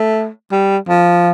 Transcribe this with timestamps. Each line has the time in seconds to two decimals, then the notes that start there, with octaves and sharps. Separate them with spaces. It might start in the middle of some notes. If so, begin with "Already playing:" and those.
Already playing: A3
0.51 G3
0.88 F3